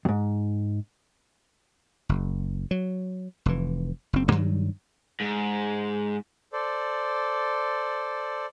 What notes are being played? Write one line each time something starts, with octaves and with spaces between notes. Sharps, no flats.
F2 G#2
F#1
F#3
F1 E3
F#1 C4
G2 D#3 F#3 G3
G#2
A4 C5 D5